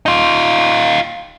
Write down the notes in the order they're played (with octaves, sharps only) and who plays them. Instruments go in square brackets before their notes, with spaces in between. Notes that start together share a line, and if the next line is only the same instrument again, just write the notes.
[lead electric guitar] D#4 F4